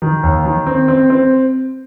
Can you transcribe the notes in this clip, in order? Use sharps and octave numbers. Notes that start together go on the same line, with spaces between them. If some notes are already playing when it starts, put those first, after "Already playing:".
D#3
D#2
D#3
C4
C4
C4